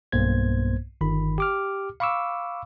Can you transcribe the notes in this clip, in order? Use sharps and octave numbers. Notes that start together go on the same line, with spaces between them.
B1 G2 A#3 B3 C5 G#6
G1 D#3 B5
G4 D6 F6
F5 B5 C#6 D6 E6